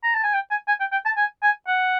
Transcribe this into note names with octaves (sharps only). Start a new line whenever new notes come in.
A#5
A5
G#5
G5
G#5
G#5
G5
G5
A5
G#5
G#5
F#5